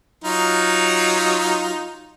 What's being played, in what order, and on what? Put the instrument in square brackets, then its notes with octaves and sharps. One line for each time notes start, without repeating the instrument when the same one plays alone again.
[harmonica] F#3 D#4 F4